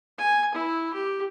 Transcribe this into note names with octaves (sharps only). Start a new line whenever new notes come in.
G#5
E4
G4